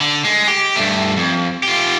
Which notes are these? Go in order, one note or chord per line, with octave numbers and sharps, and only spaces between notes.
D3
G#3
G4
G2 A3
F2
F4 G4